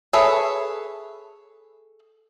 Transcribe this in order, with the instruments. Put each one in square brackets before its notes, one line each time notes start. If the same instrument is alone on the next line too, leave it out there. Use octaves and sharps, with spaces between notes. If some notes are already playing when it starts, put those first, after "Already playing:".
[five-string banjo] G#4 A4 B4 C#5 E5